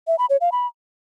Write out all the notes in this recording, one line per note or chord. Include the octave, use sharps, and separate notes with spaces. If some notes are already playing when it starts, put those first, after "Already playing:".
E5
B5
C#5
F5
B5